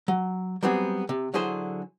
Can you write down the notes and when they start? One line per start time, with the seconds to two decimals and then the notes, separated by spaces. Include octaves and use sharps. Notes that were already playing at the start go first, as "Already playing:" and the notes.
0.08 F#3
0.63 F#3 G3 B3 C4 F#4 G#4
1.09 C3
1.34 D3 F#3 E4 G#4 C5